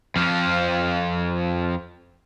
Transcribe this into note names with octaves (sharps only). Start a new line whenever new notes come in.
F2 F3